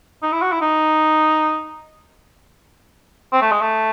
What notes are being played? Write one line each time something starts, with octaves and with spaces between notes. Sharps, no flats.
D#4
E4
F#4
E4
D#4
C4
A3
G#3
A3